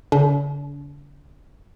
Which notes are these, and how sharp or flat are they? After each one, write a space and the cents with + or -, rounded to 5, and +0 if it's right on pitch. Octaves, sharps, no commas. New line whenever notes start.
D3 -45 D4 -45